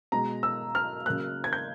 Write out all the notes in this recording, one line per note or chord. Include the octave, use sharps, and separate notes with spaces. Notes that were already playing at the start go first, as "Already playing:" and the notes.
B2 G#3 A#5
E6
F6
C#3 F#3 A#3 F#6
G#6
G6